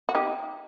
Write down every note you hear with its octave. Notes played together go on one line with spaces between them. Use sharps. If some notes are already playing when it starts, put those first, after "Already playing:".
F#4
D#4 G4